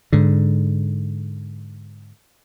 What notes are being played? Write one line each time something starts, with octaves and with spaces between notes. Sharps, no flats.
G#2 D3